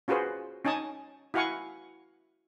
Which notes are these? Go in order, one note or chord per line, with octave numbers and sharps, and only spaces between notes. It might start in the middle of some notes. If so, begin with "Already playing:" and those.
C#4 F4 F#4 G#4 B4 C5
C#4 D#4 G#5 A5 D#6
E4 F#4 F5 F#5 G#5 C#6